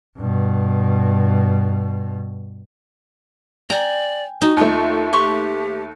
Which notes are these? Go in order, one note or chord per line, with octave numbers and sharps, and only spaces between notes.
G2 B2
D5 G5 G#5 A#5
D#4 F#4
D#2 A3 F4
G4 B4 C6 C#6